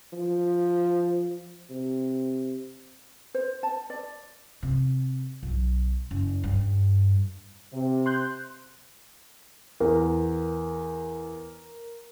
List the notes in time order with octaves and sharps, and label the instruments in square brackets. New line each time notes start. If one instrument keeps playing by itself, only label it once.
[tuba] F3
C3
[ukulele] C5
A5
D5
[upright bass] C3
B1
F#1
G2
[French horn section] C3
[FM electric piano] C6 F#6 G6
[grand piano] E2 [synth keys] A#4